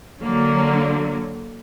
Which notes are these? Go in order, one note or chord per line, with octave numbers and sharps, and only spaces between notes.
D3 F#3 A#3